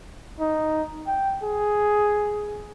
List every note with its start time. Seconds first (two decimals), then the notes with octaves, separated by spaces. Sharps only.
0.40 D#4
1.07 G5
1.43 G#4